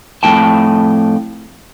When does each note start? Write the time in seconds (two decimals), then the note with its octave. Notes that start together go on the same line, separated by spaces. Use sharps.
0.23 F2 A2 G5 A5